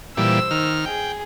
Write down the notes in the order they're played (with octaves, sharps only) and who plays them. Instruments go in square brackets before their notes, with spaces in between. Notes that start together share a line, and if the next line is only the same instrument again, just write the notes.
[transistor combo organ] A#2 E3 G3 [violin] C5 E6
[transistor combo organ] D#3 F6
[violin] G#4 [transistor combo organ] G5